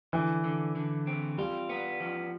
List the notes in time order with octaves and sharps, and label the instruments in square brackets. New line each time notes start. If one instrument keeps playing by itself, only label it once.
[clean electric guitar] D3 [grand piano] E3
[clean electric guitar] D3
D3
C4
[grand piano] G3 [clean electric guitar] F4
[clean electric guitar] B3
F3